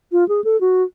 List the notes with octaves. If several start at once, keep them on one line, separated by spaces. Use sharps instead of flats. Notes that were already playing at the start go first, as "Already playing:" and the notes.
F4
G#4
A4
F#4